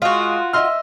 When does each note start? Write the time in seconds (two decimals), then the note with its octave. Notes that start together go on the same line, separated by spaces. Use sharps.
0.02 G#3 F4 F#4
0.53 D#5 E5 C6 F6